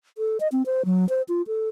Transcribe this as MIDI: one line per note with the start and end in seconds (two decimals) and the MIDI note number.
0.18 0.38 69
0.40 0.48 75
0.52 0.63 60
0.66 0.82 72
0.85 1.08 54
1.09 1.22 72
1.29 1.42 65
1.47 1.69 69